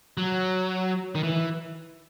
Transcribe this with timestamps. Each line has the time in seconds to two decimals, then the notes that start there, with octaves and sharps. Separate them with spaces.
0.17 F#3
1.15 D#3
1.23 E3